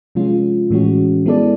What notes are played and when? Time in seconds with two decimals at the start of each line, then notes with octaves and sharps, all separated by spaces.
0.15 C3 F3 G#3 C#4 F4
0.70 A2 E3 G#3 C#4 F#4
1.26 G#3 B3 E4 A4 D5